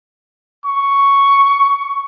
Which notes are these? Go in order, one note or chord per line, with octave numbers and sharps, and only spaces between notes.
C#6